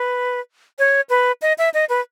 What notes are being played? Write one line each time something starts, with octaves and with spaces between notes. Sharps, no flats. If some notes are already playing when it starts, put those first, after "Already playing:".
Already playing: B4
C#5
B4
D#5
E5
D#5
B4